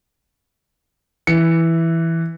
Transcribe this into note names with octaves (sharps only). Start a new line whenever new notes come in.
E3 C#7